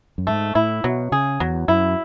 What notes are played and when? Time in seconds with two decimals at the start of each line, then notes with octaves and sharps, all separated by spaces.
0.18 F#2
0.27 G#2 A3
0.55 A2 E4
0.84 B2 F#3
1.12 C#3 G#4
1.40 E2 F#3
1.68 F#2 E4